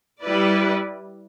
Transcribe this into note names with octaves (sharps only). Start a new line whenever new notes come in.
G3 E4 B4 D5